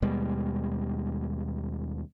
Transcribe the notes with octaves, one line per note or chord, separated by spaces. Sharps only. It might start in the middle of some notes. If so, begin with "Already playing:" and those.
D#2 B2 G3 G#3